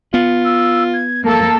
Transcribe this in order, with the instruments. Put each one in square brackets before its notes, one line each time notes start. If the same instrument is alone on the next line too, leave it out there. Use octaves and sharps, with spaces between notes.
[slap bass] B3 [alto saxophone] F4
[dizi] E6
G#6
[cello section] A#3 A4 [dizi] A5